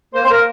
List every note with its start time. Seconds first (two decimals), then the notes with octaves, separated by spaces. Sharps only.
0.14 A#3 C5
0.25 C5
0.30 A#3 A#4